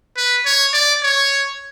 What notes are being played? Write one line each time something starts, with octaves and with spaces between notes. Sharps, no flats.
B4
C#5
D5
C#5